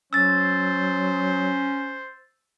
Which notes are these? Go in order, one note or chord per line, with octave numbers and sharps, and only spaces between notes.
F#3 C#4 C5 E6 A6